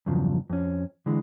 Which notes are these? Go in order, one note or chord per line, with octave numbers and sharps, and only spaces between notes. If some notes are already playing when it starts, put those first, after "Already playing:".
E2 G2 C#3 F3 F#3
F2 C#4
D3 E3 G#3